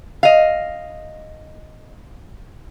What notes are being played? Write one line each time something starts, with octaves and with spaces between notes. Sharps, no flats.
D#5 F5